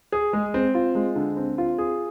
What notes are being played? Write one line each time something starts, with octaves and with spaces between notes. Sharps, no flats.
G#4
G#3
C4
F4
G#3
D3
C4
F4
G#4